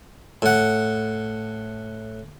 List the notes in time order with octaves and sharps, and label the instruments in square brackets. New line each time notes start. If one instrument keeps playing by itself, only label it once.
[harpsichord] A2 F#5